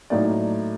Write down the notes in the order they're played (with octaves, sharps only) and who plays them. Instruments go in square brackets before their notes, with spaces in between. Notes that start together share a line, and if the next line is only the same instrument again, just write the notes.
[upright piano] A2 F#3 A#3 D#4 D5